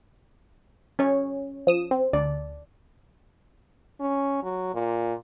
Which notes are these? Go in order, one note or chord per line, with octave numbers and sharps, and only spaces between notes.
C#4 C#5
F3 D#6 E7
C4
D2 D5
C#4
F#3
A#2